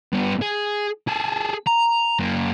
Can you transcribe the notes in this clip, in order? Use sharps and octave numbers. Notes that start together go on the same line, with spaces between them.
G2 B3
G#4
G#4 A4
A#5
F#2 A#3